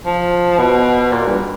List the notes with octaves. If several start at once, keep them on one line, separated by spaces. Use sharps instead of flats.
F3
B2
A#2
G2